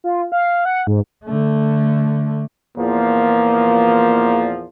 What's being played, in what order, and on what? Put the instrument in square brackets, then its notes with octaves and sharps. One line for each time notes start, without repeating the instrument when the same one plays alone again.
[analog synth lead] F4
F5
F#5
G#2
[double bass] D3 A3
[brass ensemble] E2 A#2 F3 [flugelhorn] A#3